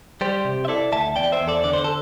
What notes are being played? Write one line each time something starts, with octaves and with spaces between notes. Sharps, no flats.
G3 G4 C5
C3
E5
E4 A4 D5
D2 E5 A5
E2 D5 G5
C5 E5
E2
A4 D5
D3 D5
C5
A4